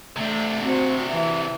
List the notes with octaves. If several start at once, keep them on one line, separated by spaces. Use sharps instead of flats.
C3 A3 D4
C4 F#4
E3 E5